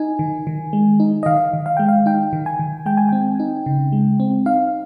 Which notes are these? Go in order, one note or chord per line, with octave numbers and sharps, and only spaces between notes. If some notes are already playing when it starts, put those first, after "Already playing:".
Already playing: D#4 G#5
D#3
D#3
G#3
D#4
D#5
D#3 F5
D#3
F5
G#3 G5
F5
D#4 G5
D#3
G#5
D#3
G#3 G5
G#5
C4 G5
D#4
C#3
G#3
C4
D#4 F5